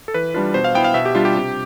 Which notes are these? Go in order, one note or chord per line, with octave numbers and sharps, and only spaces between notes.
A4
E3 B4
G3 D4 F4 B4
B2 C5
F5
B3 E4 G5
F5
B2 E5
G4
G3 D4 F4
G4
C3